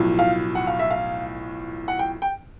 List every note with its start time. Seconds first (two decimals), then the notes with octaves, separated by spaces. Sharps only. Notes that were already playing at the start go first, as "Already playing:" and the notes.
Already playing: B1 A2 F3
0.19 F5
0.55 F#5
0.67 F5
0.79 E5
0.91 F5
1.88 F#5
1.99 G5
2.22 G5